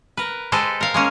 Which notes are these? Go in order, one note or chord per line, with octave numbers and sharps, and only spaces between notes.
A#4 B4
G#3 G4 A4 B4 C5
A#4 F5
G#3 A#3 C#4